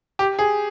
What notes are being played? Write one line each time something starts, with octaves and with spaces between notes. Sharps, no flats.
G4
G#4